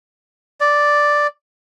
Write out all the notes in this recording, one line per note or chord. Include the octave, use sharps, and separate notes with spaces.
D5